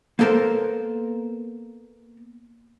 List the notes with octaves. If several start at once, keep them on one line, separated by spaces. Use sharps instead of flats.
A#3 B3 A4 A#4 C5